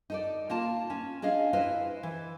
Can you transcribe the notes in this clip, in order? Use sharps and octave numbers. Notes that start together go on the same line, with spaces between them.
D#4 A4 D5
A#3 F4 A5
C#4
D4 G#4 D#5 F5
E4 B4 C5 D#5 F5
E3